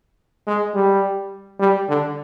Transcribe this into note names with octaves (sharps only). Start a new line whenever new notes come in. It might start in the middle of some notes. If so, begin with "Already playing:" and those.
G#3
G3
G3
D3